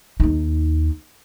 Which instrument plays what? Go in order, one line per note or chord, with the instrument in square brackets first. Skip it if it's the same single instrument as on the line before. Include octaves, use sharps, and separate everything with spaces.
[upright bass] D#2 D#4